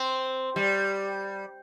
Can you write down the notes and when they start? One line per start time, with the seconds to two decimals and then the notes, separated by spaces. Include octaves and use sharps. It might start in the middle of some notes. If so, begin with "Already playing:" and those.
Already playing: C4
0.56 G3